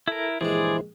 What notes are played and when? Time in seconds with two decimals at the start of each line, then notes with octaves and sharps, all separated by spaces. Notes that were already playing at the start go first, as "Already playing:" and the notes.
0.08 E4 A4 A#4
0.41 A#1 G2 E3 G#3 E4 G#4 C5 D5